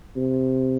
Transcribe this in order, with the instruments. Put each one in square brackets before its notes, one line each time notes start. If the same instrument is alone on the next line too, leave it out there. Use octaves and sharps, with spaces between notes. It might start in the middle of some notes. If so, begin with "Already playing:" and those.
[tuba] C3